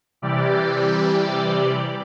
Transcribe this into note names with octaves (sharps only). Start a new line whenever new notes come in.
C3 E3 G3 G4 D5